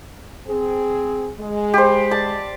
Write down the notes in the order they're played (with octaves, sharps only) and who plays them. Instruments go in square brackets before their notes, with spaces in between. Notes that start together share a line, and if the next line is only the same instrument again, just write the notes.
[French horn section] C4 G#4
G#3
[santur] G4 C5
D5 A5